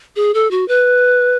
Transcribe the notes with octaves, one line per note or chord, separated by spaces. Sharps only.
G#4
A4
F#4
B4